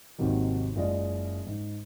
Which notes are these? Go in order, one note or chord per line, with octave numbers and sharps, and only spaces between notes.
G#1 D#2 C3 D#3 F#3
F#1 G#3 F4 D5 D#5
G#2